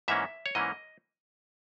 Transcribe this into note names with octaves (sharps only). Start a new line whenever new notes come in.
G#2 E3 A#3 C#4 E5
C#5
G#2 E3 A#3 C#4 D#5